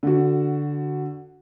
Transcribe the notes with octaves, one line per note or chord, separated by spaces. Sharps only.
D3 F#4